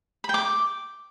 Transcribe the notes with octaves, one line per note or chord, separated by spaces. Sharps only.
B5
G5
D6